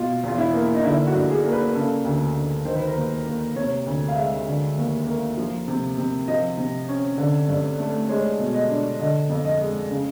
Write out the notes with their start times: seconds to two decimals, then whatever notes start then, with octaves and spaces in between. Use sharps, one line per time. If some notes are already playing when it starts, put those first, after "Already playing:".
Already playing: B2 F4
0.23 E2 F4
0.38 E4
0.54 A#3
0.74 D#4
0.84 D3 E4
1.07 F#4
1.14 G2
1.30 G#4
1.44 A#3
1.52 B4
1.75 C#3 A4
2.05 D2
2.35 D2
2.65 D#3 C5
2.76 B4
2.87 A#4
2.95 D#2 B4
3.25 A#3
3.56 C3 C#5
3.86 D2
4.08 F5
4.16 G#3 E5
4.46 D3
4.77 D#2
5.07 A#3
5.38 F3
5.68 C3
5.98 C3
6.28 F3 D#5
6.58 C3
6.88 C#4
7.18 D3
7.49 G2
7.79 A3
8.09 G#3 C#5
8.39 B2
8.54 D#5
8.69 D4
8.99 D3 D#5
9.29 F2
9.45 D#5
9.60 G#3
9.90 C#3